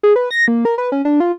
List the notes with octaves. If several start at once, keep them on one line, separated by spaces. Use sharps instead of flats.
G#4
B4
A#6
A#3
A#4
B4
C#4
D4
F4